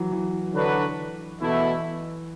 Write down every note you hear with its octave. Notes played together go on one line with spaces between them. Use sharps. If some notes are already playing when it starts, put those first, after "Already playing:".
Already playing: E3 F#3
E3
D3 F#3 D4 F#4 B4
B2 E3 A3 E4